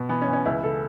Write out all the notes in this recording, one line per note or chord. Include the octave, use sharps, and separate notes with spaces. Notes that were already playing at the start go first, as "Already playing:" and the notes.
Already playing: B2
E3 B3
C#4
E3
C#4
C#2 E4
C#3 A4